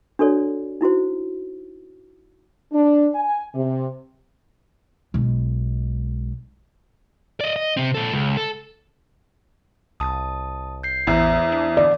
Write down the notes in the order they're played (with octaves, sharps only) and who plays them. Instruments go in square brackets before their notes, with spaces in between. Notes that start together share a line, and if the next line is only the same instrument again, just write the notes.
[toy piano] D4 F#4 A4 C#5 D5
D#4 E4 F#4 C5
[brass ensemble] D4
G#5
C3
[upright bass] B1 G#3
[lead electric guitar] D5 D#5
D#5
C3 C4
A#2 A4
C#2
A4
[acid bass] C2 [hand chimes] A5 D#6
[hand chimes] G6 C7
[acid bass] A1 [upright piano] E2 [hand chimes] C5 E5 A#5
[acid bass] D4
[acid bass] D3 [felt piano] D5